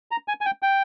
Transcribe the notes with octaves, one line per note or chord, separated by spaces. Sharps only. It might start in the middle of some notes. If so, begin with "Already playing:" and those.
A#5
G#5
G#5
G5
G5